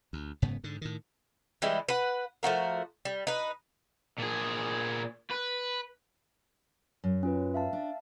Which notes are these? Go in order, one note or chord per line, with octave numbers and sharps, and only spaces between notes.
D2
F#1 G#2 C#3 B3
G#2 D3
A2 D#3
E3 G3 G#3 E4
B4 F#5
F3 A3 F#4 A#4
G3
D#4 B4
A#2 G#4
B4
F#2
C#4 F4 B4
E5 F5 A5
D4